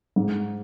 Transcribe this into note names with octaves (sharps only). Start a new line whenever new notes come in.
G#2